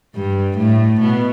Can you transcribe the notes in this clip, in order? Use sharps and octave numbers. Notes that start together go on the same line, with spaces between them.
G2 G3
A2 A3
B2 B3